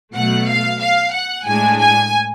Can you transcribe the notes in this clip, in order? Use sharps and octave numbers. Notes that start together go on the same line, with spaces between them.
B2 F#3 A3 F#5
F5
F5
F#5
A2 G#3 D4 G#5
G#5